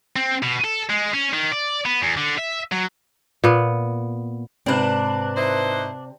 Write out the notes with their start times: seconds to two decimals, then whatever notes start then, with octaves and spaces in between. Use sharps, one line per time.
0.16 C4
0.43 B2
0.64 A4
0.89 G#3
1.14 C#4
1.34 D#3
1.52 D5
1.85 B3
2.02 E2
2.17 D3
2.39 E5
2.72 F#3
3.44 A#2 B3
4.66 G#2 C3 C4 D4 B4 F#6
5.36 D#4 E4 C5